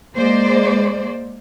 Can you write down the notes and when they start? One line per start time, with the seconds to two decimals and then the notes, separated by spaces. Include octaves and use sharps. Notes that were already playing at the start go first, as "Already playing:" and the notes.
0.15 G#3 A#3 C5 D5